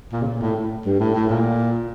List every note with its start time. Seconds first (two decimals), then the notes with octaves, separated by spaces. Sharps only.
0.13 A#2
0.22 C#3
0.27 A#2
0.42 A2
0.56 A2
0.86 G2
1.00 A2
1.15 A2
1.30 A#2